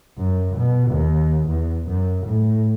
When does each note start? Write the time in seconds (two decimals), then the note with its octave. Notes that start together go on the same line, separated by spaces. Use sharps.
0.19 F#2
0.57 B2
0.91 D#2
1.48 E2
1.88 F#2
2.27 A2